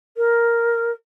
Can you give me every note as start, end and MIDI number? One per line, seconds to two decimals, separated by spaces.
0.17 0.91 70